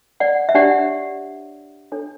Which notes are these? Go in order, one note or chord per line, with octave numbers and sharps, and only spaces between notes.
D5 F#5
E5
D4 G4 C#5 D5 F#5
D4 A4 C#5